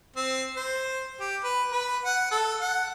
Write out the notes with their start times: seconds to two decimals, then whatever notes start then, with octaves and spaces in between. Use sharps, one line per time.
0.16 C4
0.57 C5
1.21 G4
1.44 B4
1.72 B4
2.05 F#5
2.31 A4
2.61 F#5